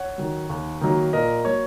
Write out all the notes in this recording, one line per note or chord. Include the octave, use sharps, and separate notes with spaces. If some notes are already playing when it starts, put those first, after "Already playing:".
Already playing: C#5 F#5
D#3 F#3
D#2
D#3 F#3 A#3
A#2 A#4 D#5
F#3 A#3 C#5